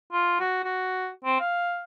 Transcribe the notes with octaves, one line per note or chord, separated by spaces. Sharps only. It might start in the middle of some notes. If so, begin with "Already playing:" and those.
F4
F#4
F#4
C4
F5